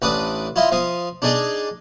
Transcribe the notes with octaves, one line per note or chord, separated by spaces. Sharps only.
A1 D4 B4 D6 D#6
E4 F4 D#5
F3 F5 D#6
D4 D#4 G#4 D5 D#5